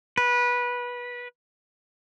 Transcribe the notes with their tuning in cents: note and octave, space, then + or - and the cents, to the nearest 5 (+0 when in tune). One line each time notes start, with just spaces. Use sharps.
B4 -20